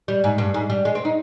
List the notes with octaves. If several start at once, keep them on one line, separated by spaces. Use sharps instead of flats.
G3
G#2
G2
G#2
G3
G#3
C4
D#4